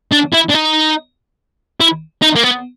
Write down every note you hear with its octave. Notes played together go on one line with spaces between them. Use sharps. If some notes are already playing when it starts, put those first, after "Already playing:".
D4
E4
D4
D#4
E4
D#4
A#3
B3